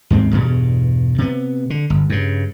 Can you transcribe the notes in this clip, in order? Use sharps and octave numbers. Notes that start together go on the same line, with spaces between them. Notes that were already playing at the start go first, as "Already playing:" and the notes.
D#2 G#2 G3 C4
E2 G2 B2
C3 B3
D3
G1
G2 C#3